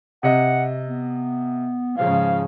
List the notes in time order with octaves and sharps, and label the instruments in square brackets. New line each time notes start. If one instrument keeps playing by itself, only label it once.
[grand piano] C3 D#5 [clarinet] F#5
[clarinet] B3
[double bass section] G#2 C#3 F3 [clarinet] F5